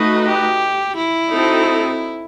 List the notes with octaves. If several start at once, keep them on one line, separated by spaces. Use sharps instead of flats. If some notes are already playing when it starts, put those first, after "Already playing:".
Already playing: A3 D#4 F#4 B4 D#5
G4
E4
C4 D#4 F#4 A4